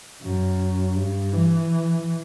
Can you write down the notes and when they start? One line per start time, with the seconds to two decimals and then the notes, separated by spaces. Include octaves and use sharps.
0.22 F#2
0.95 G2
1.33 E3